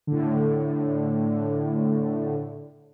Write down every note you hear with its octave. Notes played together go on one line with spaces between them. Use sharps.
A2 D3